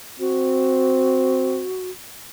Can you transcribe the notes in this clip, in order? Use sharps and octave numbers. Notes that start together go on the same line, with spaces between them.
C4 F#4